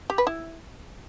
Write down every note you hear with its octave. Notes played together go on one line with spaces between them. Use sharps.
G4
B4
E4